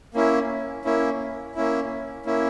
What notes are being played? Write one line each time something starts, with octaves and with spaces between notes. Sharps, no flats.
A#3 C#4 E4
A#3 C#4 E4
A#3 C#4 E4
A#3 C#4 E4